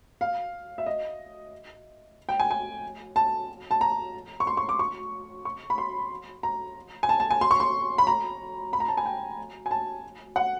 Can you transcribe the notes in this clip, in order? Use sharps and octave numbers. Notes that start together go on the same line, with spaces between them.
F5
E5
D#5
G5
G#5
G#5
A5
A5
A#5
C#6
C6
C#6
D6
C#6
C#6
B5
C6
A#5
G#5
A5
A5
G#5
C6
C#6
C6
B5
A#5
B5
A#5
A5
G#5
G5
G#5
A5
F#5